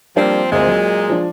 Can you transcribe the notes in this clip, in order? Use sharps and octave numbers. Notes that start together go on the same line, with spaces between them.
F3 G3 A#3 C4 D4
D2 A#2 G#3 C4
F#3
F3 D4